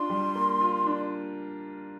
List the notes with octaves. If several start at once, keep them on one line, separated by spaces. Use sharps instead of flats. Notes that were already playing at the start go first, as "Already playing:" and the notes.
Already playing: D4 F4 C6
G3
A#3
F4
D4